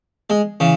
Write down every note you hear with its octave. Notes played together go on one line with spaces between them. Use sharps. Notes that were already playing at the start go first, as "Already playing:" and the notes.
G#3
C#3 E3